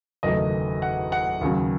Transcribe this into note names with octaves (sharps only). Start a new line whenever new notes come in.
F#1 E2 D#3 F#3 A3 D#5
F#5
F#5
D#2 C#3 F#3